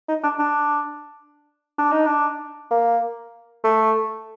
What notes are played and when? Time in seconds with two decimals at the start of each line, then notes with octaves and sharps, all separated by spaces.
0.08 D#4
0.23 D4
0.39 D4
1.78 D4
1.92 D#4
2.06 D4
2.71 A#3
3.64 A3